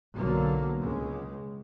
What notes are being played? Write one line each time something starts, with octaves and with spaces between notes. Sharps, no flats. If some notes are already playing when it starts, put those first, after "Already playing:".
B1 D3 F#3 A#3
C#2 C#3 G#3